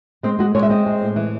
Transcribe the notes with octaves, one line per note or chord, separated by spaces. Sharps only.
G#3 C4
G#3 F#4
G#3 C#5
E5
C4 D#5
G#3
A2
E3